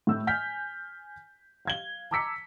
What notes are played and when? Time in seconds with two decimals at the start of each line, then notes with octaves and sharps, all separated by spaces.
0.07 A2 E6 G6
0.27 G#5 F6 G6 B6
1.65 F5 G#6 G7
2.11 A5 A#5 D6 E6 B6 C#7